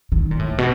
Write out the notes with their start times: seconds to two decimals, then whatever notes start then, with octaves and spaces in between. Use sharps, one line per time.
0.12 D#3
0.31 A#2
0.39 A2
0.58 B2